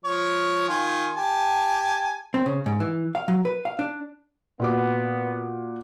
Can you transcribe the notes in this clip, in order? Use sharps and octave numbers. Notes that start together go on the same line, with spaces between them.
F3 C#5
D#3 F4 G#5
G4 G#5 A5
C4
C#3
G#2
E3
F5
F#3
B4
F5
D4
A#2 B3 F#4 D6